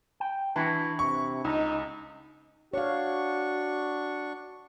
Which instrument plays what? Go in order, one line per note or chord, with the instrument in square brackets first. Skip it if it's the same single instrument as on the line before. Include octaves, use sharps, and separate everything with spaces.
[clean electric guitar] G5
[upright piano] E3 [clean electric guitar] D4 E4 F#4
[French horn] C3 [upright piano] C#6
[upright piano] C#2 [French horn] D#4
[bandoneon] D4 C#6 [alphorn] F#4 [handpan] C#5 F5